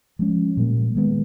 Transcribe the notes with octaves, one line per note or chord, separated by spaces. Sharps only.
F3 G#3 C#4
A#2 G3 A#3
D#3 G#3 B3